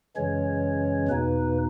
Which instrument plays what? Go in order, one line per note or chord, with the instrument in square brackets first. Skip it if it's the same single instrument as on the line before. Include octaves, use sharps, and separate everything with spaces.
[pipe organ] F#2 C#3 E3 G#3 C#4 C#5
E2 B2 A#3 D#4 B4